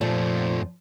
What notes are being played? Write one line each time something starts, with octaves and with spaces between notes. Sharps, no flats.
F2 A#2 F3 A3